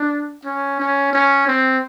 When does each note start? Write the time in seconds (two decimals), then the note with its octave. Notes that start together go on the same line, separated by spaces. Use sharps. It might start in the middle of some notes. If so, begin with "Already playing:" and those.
Already playing: D4
0.45 C#4
0.80 C#4
1.13 C#4
1.47 C4